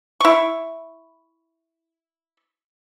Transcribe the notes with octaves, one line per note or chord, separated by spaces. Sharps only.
E4 C#6